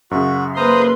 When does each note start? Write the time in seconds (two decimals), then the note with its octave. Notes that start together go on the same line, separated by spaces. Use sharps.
0.11 F#2 C#3 F#4
0.57 A#3 B4 C5 A#5 C6 D#6